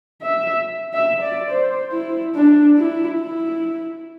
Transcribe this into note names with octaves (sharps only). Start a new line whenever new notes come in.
E5
E5
D5
C5
E4
D4
E4
E4